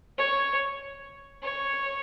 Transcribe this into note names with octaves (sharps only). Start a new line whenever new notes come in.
C#5
C#5